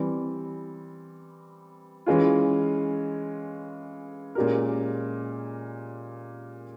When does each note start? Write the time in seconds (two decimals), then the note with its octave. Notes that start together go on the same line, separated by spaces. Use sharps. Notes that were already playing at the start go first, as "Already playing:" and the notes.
Already playing: E3 G3 C4
2.06 E3 G#3 C#4 F4
4.35 A#2 G#3 C#4 G4 A#4